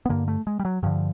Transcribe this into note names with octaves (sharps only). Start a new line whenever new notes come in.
B3
G2 D3 A#3
A3
G#3
G3
F#3
G2 D3 F3